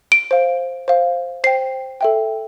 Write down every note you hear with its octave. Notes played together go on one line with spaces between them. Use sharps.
D7
C5 F5
C5 F5
C5 G5 C7
A4 E5 G5